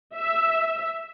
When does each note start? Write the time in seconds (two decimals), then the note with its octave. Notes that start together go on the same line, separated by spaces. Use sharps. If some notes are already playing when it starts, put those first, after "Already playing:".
0.15 E5